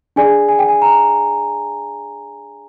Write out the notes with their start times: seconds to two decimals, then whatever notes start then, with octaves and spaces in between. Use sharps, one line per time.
0.16 D4 G#4 D5 G#5
0.49 G#5
0.59 G5
0.69 G#5
0.82 A#5